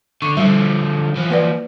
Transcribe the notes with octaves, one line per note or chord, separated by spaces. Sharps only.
D3 C#6
D3 F3 G3 E5
E3 F3
A#3 B4 D5